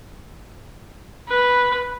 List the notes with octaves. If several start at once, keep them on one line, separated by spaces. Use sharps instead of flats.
B4